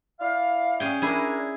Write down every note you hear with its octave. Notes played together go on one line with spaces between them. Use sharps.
E4 D5 F5
C#4 G#4 G5
D4 E4 G#4 A#4